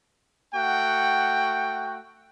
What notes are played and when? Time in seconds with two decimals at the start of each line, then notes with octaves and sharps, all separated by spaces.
0.54 A3 F#4 F#5 G5